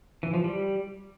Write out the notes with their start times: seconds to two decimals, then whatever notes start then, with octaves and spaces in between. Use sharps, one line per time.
0.23 E3
0.34 F3
0.44 G3